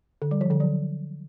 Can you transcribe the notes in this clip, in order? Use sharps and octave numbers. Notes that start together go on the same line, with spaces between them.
D3
G3
F3
D3
F#3